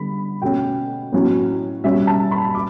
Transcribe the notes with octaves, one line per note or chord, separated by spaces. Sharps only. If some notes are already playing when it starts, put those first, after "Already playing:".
Already playing: D3 G3 B3 B5
B2 A3 C#4 G5
A2 F#3 C#4
B2 G3 C#4 E5
A5
B5
D6